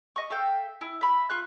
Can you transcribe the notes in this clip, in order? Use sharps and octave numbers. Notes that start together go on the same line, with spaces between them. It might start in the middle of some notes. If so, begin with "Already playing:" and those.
D#5 C#6
A4 E5 F5 G5
E4
E5 B5
F4 C#6 F#6